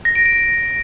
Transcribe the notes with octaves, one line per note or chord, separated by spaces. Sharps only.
A#6
D7
D7